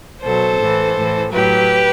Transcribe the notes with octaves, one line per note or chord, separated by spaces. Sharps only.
B2 F#3 A4 C5
A2 E3
A2 E3
A2 F#3 G4 B4